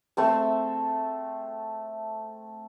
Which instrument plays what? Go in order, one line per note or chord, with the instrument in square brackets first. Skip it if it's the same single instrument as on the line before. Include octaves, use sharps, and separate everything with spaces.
[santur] A3 C4 A5